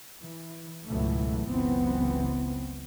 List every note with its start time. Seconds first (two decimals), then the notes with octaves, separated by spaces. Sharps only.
0.20 E3
0.87 C#2 G#2 B2 E3 F#3 A3
1.49 F#1 C#2 E3 B3 C4